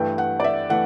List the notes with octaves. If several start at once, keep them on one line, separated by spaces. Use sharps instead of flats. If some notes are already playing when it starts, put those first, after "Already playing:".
Already playing: G2 E3 A3 G5
F#5
D5
E5
E3 A3 F#5